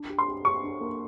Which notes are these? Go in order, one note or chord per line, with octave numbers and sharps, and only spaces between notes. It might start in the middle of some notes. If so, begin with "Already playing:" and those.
Already playing: D4
G4
C6
G4
G4 C#6
D4
A#3